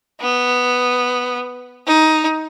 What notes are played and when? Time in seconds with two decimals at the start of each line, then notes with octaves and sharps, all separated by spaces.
0.21 B3
1.87 D#4